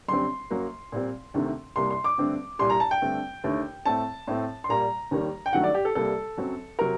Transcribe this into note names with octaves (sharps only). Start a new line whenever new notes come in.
F#2 D3 G3 C4 C6
F#2 F#3 A#3
A#2 G3 C4
D2 C3 D#3 A3 C4
C2 C3 G3 A#3 C6
C6
D6
G2 D3 A3 C4
C2 A#2 G3 C6
A#5
A5
G5
G2 D3 A3 C4
D#2 D3 A3
A2 A3 C4 A5
A2 A3 C4
C6
A#2 G3 A#3 A#5
D#2 D#3 G3 A#3
G5
G2 D#3 F#3 A3 F#5
D5
G4
A4
C2 C3 G3 A#3 A4
F#2 F#3 C4
C3 F#3 A#4